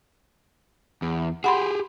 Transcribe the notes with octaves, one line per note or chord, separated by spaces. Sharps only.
E2
G4 G#4 F#5 B5 C6